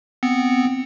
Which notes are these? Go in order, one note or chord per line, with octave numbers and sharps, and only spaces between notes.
B3 C4 C#7